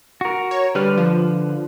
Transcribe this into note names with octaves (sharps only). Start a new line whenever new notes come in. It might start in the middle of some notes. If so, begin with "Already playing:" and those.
F#4 A#4
C#5
D3 G3 B4 F6
F3